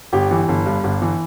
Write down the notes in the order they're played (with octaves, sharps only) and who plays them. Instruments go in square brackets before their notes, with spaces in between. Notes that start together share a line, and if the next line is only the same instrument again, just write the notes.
[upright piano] G1 G4
E3
G1
G2
G1
E3